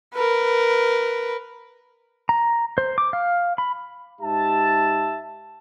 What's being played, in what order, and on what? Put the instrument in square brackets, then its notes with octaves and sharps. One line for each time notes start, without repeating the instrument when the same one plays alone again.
[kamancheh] A#4 B4
[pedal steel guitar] A#5
C5
D6
F5
B5
[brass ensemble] G#2 G4 E5 A5